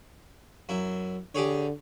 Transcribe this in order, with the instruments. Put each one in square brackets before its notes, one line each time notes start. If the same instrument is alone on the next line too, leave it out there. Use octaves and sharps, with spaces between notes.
[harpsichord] F#2 E4
[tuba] D3 [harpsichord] G4 G#4 C#5